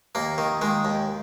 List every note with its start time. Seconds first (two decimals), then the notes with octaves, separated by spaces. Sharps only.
0.15 D#2 A#3
0.38 D#3
0.62 D#3 G#3
0.85 D#2